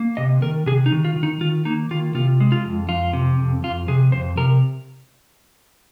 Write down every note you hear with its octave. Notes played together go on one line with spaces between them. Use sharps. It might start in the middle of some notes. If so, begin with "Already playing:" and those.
Already playing: A#3
C3 D#5
D#3 A#4
C3 G#4
D#4
D#3
F4
D#3
D#4
D#3 F4
A#3 D#4
D#3 F4
C3 F4
G#3
F4
F2
F2 F4
C3
F2
F2 F4
C3 G#4
F2 C5
C3 A#4